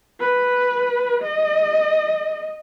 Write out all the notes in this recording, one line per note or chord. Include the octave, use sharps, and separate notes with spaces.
B4
D#5